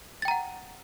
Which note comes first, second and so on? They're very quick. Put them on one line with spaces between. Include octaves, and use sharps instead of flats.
A6 G5 A#5 F#5